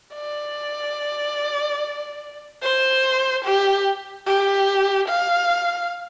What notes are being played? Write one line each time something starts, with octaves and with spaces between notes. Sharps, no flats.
D5
C5
G4
G4
F5